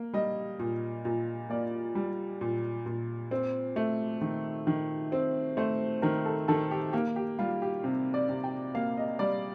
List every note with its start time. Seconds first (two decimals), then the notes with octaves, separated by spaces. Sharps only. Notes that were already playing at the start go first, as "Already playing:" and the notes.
Already playing: A#3
0.13 G3 D#5
0.59 A#2
1.05 A#2
1.49 A#3 D5
1.95 G3
2.41 A#2
2.86 A#2
3.31 C4
3.76 A3
4.21 D#3
4.67 D#3
5.12 C4
5.57 A3 C5
6.02 D#3 A#4
6.26 A4
6.48 D#3 A4
6.71 G4
6.93 A#3 G4
7.16 G4
7.39 G3 F4
7.62 G4
7.84 C3
8.14 D5
8.29 C3
8.44 G5
8.75 A#3 F5
8.97 D#5
9.19 G3 D5